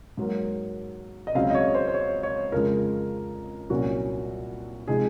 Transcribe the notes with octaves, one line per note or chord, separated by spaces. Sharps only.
G#2 F#3 A#3
D#5
C#2 C#3 F#3 C4 F5
D#5
C#5
C5
C5
C#5
C#5
F2 C#3 F3 G#3 A#4
C2 A#2 F#3 C#4 F#4
C3 F3 G#3 D#4 G#4